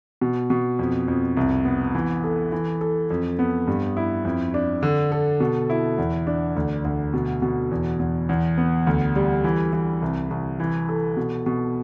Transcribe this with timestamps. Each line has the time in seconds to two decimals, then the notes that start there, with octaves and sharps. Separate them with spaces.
0.21 B2
0.50 B2
0.79 F2
1.08 F2
1.37 C2
1.65 B3
1.95 E3
2.24 A4
2.52 E3
2.81 A4
3.10 F2
3.39 B3
3.67 G2
3.97 E4
4.25 F2
4.54 D4
4.83 D3
5.12 A4
5.40 B2
5.70 E4
5.98 E2
6.27 D4
6.56 D2
6.85 D2
7.14 B2
7.42 B2
7.71 E2
7.99 E2
8.29 E2
8.58 B3
8.87 D2
9.16 G3
9.44 E3
9.73 E3
10.02 C2
10.30 C2
10.60 E3
10.89 A4
11.17 B2
11.46 B2